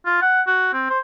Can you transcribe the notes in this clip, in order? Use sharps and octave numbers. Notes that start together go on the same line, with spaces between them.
F4
F#5
F#4
C4
C5